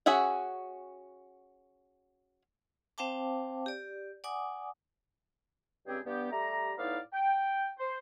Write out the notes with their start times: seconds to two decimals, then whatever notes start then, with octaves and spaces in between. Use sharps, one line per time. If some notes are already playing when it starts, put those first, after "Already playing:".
0.06 C#4 F#4 G#4 E5 F#5
2.98 C4 C5 F5 G5 A5 D6
3.66 G4 D5
4.24 D5 F#5 G#5 D6 D#6
5.86 C#2 G2 C4 G4 G#4 G5
6.05 G2 B3 G4
6.31 G3 A3 G4 A#5
6.78 A2 B3 D#4 E4 D5 F5
7.13 G5
7.79 C5